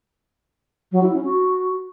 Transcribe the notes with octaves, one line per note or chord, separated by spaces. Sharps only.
F#3
E4
C#4
F#4